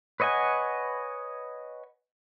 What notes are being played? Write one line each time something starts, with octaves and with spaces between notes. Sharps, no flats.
B4 C#5 D#5 F#5 G#5